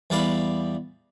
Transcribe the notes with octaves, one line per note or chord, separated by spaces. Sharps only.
E2 G3 D5 F5 B5